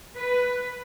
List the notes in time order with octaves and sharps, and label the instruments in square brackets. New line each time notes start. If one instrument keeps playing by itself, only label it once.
[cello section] B4